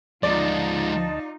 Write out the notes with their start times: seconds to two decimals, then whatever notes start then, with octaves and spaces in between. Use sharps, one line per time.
0.23 D2 F3 G#3 D#4 F4 D5 D#5 A5